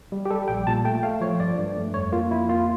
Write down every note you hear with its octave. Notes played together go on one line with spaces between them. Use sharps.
G3
G4
G3 A4
A#1 G5
A#2 A5
A3 G5
A3 F5
F3 C#5
G2 D5
G2
A3
F2 C#5
A#3 F4
F2 E4
A#3 F4